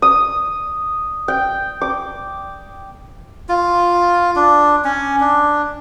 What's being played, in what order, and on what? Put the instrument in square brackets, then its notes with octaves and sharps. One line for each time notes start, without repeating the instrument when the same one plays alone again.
[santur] D#6
G5
D6
[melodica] F4
D4
C#4
D4